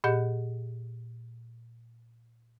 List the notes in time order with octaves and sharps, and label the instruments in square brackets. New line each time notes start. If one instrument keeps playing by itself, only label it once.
[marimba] A#2 G4 G#4 D#5 F#5 G6